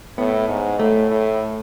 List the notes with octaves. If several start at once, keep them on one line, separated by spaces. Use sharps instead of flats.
A2 B3
G#2
A2 A3
A2